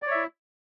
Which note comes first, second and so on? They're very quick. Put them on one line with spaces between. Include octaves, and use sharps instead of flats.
D5 C#5 E5 E4